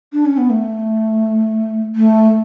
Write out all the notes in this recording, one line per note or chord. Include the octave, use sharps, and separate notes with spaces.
D4
C#4
B3
A3
A3